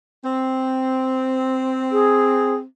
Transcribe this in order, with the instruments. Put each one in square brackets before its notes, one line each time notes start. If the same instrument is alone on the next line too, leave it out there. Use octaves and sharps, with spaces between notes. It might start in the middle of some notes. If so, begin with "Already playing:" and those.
[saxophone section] C4
[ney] G#4